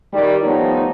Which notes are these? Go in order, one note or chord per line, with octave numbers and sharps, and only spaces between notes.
D#3 G3
F3 G3 A3 B3 D#4 C#5